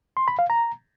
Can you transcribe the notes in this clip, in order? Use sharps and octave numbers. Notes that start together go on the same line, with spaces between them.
C6
B5
F5
A#5